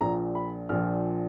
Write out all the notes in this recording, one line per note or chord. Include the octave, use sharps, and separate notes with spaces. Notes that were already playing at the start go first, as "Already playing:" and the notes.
A#1 A#2 F3 A#5
B5
A#1 A#2 F3 F6